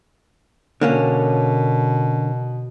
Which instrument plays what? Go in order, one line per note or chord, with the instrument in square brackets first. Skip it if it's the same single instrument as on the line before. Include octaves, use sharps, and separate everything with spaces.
[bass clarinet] B2 [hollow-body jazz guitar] D3 A#3 C#4